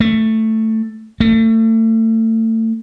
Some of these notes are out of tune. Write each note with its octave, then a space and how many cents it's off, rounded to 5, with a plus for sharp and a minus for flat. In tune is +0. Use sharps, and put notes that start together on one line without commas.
A3 +5
A3 +30